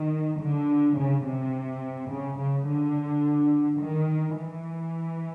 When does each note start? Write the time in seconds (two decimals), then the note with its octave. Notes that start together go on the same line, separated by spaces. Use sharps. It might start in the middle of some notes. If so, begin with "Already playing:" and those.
Already playing: D#3
0.41 D3
0.97 C#3
1.25 C3
2.11 C#3
2.39 C#3
2.67 D3
3.81 D#3
4.37 E3